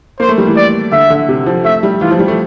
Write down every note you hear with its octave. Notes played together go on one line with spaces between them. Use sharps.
A#3 C5
A3
G3
E3
D5
D3 E5
D3
C3
F3
A3 E5
G3
E3 F4
F3
G3
A3